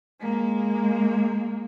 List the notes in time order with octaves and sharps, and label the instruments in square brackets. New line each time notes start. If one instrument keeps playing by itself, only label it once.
[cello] G#3 A#3